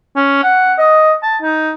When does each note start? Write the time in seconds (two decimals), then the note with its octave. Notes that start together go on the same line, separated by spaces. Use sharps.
0.16 C#4
0.43 F#5
0.79 D#5
1.23 A5
1.42 D#4